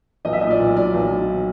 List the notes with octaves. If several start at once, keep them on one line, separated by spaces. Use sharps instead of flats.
B1 D#5
E5
A#2 D#5
D5
B1
F#3 D5
B1
F#3